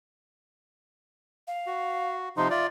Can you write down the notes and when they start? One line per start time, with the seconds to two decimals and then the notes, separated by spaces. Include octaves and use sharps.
1.47 F5
1.67 F#4
2.37 C3 F3 D#4 C6
2.50 F4 D5 E5